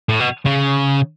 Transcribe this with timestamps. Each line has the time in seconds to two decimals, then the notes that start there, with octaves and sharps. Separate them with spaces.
0.09 A2
0.20 B2
0.46 C#3